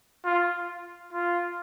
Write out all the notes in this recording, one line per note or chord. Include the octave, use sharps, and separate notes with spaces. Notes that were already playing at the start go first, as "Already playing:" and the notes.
F4
F4